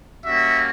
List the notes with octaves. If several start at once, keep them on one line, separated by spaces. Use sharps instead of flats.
G3 A#3 C#4 F#4 E5